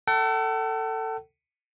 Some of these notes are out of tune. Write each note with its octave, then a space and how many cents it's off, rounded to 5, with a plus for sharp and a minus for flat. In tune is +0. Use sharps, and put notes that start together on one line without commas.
A4 +15 F#5 +45